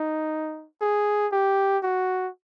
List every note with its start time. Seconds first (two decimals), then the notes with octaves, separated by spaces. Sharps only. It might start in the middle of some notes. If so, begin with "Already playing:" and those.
Already playing: D#4
0.81 G#4
1.32 G4
1.83 F#4